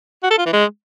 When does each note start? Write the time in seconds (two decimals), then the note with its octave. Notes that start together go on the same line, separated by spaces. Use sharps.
0.23 F#4
0.31 A4
0.38 F4
0.46 E3
0.53 G#3